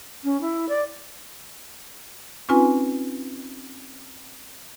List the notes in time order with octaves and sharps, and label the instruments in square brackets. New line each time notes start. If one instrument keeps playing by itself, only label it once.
[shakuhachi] C#4
E4
D5
[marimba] C4 C#4 D#4 F4 B4 G#5